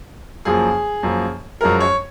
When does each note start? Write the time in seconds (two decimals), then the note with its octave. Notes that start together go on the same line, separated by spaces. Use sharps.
0.45 F#2 F3 A#3 G#4
1.03 F#2 F3 A#3
1.61 F#2 F3 G#3 A#4
1.80 C#5